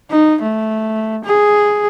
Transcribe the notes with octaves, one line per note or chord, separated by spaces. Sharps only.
D#4
A3
G#4